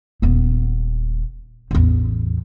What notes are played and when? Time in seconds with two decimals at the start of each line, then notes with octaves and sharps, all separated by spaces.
0.22 D#1 B3
1.71 A1 E2